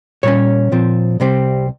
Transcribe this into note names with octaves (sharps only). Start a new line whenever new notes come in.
A#2 G3 C#4 C#5
A#2 F3 C4
C2 C3 G3 C4